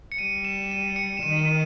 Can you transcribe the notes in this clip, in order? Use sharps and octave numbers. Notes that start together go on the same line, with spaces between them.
C#7
G3 D#7
E7
D#7
C#7
E7
D#3 D#7
D#7